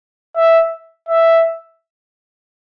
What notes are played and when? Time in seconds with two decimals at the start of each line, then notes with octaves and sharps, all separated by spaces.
0.36 E5
1.09 E5